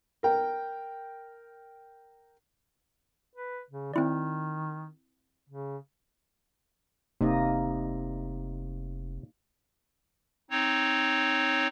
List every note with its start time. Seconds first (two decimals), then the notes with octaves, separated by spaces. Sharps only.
0.23 A#4 G5
3.36 B4
3.70 C#3
3.94 D#3 C4 E4 D5
5.50 C#3
7.21 F1 C3 A#3 D#4 D#5
10.50 C4 D#4 C#5